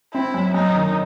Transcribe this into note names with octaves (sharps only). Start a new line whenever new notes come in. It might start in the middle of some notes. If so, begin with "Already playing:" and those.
C4 E4
F#2
F#2 D#4
D#3